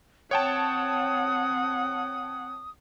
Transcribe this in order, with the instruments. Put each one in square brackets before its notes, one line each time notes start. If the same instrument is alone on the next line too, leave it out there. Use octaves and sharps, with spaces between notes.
[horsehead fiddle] C4 F#5 [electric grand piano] C#5 G5 A5 [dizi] D#6